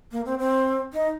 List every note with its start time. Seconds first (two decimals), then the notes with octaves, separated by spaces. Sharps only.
0.12 A#3
0.26 C4
0.39 C4
0.93 D#4